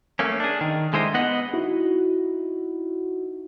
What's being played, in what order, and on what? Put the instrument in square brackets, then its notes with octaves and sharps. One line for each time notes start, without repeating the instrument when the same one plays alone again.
[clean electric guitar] A3 A#3 C#4
D4 G#4
D#3
D3 G#3 E4 C5 D#5
B3 B4 D#5 F#5
[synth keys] D#4 E4 F#4